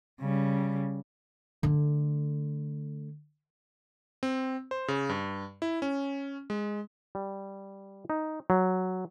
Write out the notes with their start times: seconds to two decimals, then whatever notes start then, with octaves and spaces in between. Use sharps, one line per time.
0.21 C#3 G3
1.63 D3 A3
4.23 C4
4.71 C5
4.88 C#3
5.09 G2
5.62 E4
5.82 C#4
6.50 G#3
7.15 G3
8.10 D#4
8.50 F#3